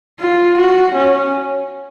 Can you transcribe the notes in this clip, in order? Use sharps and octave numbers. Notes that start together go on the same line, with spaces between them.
F4
F#4
C#4